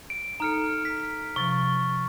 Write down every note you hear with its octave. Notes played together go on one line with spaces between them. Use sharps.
D7
D#4 A4 A#5 F6 C#7
B6
C3 F3 C#6 A6